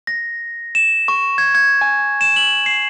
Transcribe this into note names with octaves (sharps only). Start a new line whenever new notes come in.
A#6
E7
C#6
G#6
G#6
G#5
E7
F#7
C7